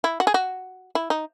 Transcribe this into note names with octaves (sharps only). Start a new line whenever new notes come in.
E4
F#4
G#4
F#4
E4
D#4